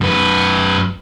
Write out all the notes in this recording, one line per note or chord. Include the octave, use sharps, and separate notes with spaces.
F#2 B4